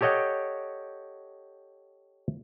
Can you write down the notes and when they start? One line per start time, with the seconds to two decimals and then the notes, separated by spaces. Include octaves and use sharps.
0.01 G4 A4 C#5 D#5 F#5 G5